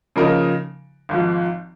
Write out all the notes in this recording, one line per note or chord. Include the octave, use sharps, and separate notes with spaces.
C#3 F3 A#3 D#4 A#4
G#1 G#2 F3